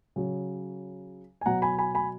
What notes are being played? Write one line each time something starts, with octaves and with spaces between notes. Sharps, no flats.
C#3 F#3
G#5
B2 F#3 F#5 A#5
G#5 B5
G#5 B5
G#5 B5